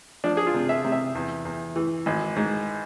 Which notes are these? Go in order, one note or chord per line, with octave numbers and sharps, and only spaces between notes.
F3 D4
G#4
F4
C3
E5
C3
E5
E2
E2
E3
G#1
G#2